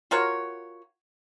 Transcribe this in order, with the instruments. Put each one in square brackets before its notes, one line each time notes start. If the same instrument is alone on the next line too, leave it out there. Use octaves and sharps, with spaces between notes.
[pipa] F4 F#4 A#4 C#5